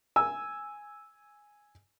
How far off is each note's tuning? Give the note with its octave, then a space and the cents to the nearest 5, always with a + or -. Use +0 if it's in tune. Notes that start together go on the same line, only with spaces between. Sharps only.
G#5 +0 E6 -5